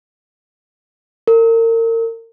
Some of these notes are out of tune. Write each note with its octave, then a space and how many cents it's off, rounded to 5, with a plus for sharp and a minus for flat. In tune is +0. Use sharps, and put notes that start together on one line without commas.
A#4 -35